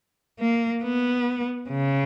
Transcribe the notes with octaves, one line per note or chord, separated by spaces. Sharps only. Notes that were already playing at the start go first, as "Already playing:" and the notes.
A#3
B3
C#3